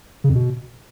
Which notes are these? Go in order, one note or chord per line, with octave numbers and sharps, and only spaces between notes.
C#3
F2
B2